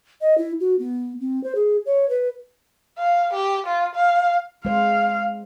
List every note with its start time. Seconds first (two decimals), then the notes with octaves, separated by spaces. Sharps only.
0.21 D#5
0.38 E4
0.60 F#4
0.79 B3
1.20 C4
1.44 C5
1.55 G#4
1.86 C#5
2.09 B4
2.98 F5
3.33 G4
3.67 F4
3.95 F5
4.65 G#3 C5 F5